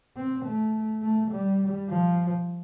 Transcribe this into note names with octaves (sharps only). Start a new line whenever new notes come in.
C4
A3
A3
G3
F3